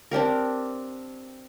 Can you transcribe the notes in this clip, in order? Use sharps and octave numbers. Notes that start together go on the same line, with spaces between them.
C4 D4 G4 A#4